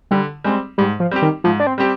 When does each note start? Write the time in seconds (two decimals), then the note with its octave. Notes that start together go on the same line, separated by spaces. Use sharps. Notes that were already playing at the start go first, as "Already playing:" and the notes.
0.11 D3 G3
0.44 G3 G#3 C4
0.78 G#2 G3
1.00 F3
1.11 G3 C4 G4
1.22 D#3
1.44 G#2 F3
1.60 D4
1.67 C4
1.78 G3 C4 G4